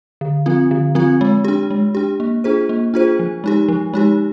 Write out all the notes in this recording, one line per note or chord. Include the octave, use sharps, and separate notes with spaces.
D3
F3 C4 F4
D3
F3 C4 F4
G#3
D4 G4
G#3
D4 G4
A#3
D4 F4 G#4 C5
A#3
D4 F4 G#4 C5
F3
G#3 D#4 G4
F3
G#3 D#4 G4